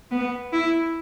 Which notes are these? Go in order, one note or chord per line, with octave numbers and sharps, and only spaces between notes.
B3
E4